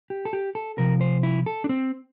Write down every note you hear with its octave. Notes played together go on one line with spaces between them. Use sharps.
G4
A4
G4
A4
C3 F3 A#4
C5
E4
A4
D4
C4